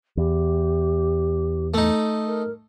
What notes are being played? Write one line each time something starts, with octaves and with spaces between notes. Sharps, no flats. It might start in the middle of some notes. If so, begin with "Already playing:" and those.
E2 G4
A3 D#4
A#4